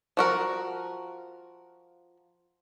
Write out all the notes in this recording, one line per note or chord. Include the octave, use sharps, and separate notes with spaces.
F3 F#4 A#4